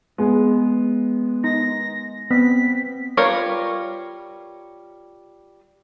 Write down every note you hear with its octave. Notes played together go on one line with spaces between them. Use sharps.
G#3 B3
D#4 A#6
B3 C4 B6
G3 F4 A#4 B4 C#5